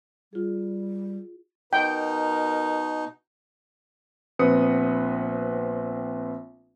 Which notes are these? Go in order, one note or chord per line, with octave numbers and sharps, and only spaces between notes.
G3 F4 G#4
B2 D#4 A#4 G5
A#1 B3 C4 B4 D#6 C#7